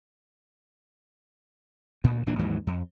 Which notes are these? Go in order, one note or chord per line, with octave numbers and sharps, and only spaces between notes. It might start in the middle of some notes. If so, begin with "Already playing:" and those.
D2 A#2
D#1 A#2 E3 D4
D#2 G#2 E3 F#3
F2